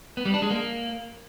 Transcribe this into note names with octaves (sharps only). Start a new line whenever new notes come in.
B3
G3
D4
G#3
A#3